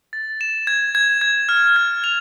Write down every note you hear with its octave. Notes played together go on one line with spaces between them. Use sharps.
A6
E7
G#6
G#6
G#6
F6
G#6
F7